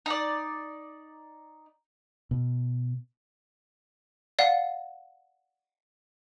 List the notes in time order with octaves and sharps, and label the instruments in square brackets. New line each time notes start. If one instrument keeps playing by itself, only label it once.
[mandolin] D#4 D5
[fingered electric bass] B2
[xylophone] D5 F5 F#5